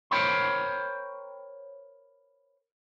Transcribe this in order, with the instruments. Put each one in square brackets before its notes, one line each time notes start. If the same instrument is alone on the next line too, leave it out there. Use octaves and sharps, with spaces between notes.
[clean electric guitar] A#4 C5 C#5 G5 B5 C6